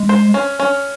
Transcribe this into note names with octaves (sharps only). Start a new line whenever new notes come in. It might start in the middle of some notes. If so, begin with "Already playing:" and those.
Already playing: G#3
C5
C#4
C#4